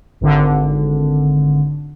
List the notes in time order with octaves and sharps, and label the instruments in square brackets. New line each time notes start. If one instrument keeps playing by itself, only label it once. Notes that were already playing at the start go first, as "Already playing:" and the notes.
[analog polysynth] G#1 D3